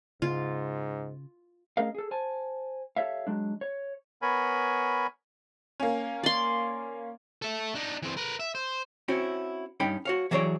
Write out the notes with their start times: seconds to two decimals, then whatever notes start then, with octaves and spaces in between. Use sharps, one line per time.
0.22 G#2 C#3 F4
1.77 A3 C#4 G#4 A#4 D#5 F5
1.95 G#4 A4
2.11 C5 G#5 A5
2.96 G4 A4 B4 C#5 E5 F5
3.27 F#3 G#3 D4
3.61 C#5
4.22 B3 A#4 C#5 G#5 B5
5.80 A#3 C#4
6.23 D5 C6
7.42 A4 E5
7.75 D4 D#4
8.02 E3 C4
8.17 A#4 B4
8.40 E5
8.55 C5
9.08 C4 C#4 E4 F#4
9.80 G2 C#4 D#4 G5 B5
10.05 F#4 C#5 F5
10.31 E3 F#3 G#4 A#4 C#5 D5